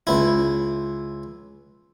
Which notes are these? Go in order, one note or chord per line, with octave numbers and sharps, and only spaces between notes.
C#2 E4